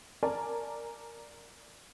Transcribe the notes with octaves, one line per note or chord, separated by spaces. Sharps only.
A#4 D5 G#5 A5